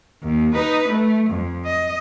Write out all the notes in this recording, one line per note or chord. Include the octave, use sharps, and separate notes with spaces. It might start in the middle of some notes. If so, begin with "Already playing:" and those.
D#2
D#4 B4
A3
F2
D#5